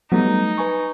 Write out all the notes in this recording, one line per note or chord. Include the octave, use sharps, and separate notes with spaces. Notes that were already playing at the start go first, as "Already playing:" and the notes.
F#3 G3 A3 B3 D#4
B4 G#5 C#6